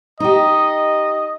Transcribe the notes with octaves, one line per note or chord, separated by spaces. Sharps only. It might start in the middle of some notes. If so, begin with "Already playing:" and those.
D#4 G4 D#5